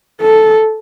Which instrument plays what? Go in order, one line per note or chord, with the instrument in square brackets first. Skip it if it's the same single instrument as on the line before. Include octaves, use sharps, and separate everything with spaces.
[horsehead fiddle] A4